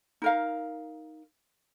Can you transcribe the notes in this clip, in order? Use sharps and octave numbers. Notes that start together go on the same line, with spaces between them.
D#4 A#4 F5